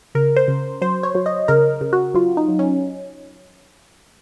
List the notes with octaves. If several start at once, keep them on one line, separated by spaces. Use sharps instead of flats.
C#3 A#4
C5
C#3
F#3 C5
C#5
F#3
D#5
C#3 A#4
C#3
F#4
F#3 F4
D#4
F#3
C#4